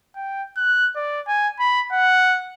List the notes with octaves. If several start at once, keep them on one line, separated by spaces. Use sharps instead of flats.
G5
F#6
D5
G#5
B5
F#5